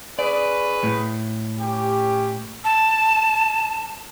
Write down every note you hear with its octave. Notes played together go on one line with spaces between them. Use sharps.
C#4 G#4 B4 D5
A2
C#4 G4
A5